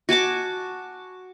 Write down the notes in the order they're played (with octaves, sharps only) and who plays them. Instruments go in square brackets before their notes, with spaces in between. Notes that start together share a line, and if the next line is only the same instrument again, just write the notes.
[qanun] F#4 G#5 A5 D6